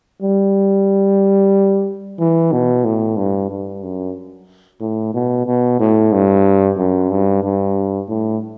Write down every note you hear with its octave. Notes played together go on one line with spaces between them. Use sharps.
G3
E3
B2
A2
G2
G2
F#2
A2
B2
B2
A2
G2
F#2
G2
G2
A2